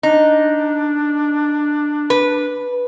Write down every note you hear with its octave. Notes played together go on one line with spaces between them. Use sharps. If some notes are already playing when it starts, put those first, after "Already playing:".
D4 D#4
B4